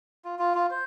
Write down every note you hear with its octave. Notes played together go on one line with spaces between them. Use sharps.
F4
F4
F4
C5